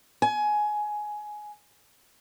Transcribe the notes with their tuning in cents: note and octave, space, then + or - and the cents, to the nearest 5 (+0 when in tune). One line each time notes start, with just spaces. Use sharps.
G#5 +15